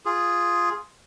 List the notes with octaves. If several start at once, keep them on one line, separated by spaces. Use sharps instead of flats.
F4 G#4